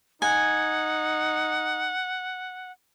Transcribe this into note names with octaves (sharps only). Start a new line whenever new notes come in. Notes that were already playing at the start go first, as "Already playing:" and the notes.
D#4 F#5 G#5